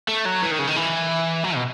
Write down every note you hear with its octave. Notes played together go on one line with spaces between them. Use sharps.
A3
F#3
E3
D#3
C#3
D#3
E3
F#3
B2